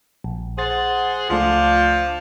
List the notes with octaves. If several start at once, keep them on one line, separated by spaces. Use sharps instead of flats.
A#1
G#4 C5 F#5 A6
C#2 F3 A3 D4 F4